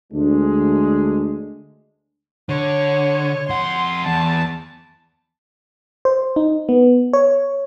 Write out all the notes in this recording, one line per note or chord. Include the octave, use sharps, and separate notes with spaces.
D2 G#3 D4
D3 C#5
F2 F#5 C6
E2 A5
C5
D#4
B3
C#5